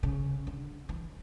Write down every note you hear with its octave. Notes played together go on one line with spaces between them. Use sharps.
C#3
D3
E3